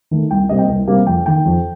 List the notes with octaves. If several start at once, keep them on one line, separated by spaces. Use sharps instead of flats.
D#3 A3
C2 G5
C3 G3 A#3 D#5
G5
C2
C3 G3 A#3
F2 G5
D#3 A#3 G5
F2